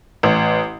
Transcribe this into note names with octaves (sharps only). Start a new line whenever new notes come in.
A1